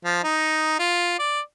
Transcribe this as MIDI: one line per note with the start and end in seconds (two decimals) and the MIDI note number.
0.05 0.19 53
0.23 0.77 63
0.79 1.15 65
1.19 1.40 74